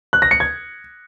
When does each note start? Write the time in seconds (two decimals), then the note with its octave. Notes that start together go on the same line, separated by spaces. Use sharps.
0.13 F#6
0.22 A#6
0.31 C#7
0.40 G#6